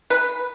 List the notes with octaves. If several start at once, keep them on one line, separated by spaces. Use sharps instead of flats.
B4